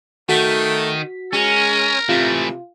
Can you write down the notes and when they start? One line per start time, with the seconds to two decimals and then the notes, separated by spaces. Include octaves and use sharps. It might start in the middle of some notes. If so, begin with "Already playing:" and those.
0.29 D#3 A3 F#4 B6
1.33 G#3 C#4 A#4
2.09 C3 E3 A3 F4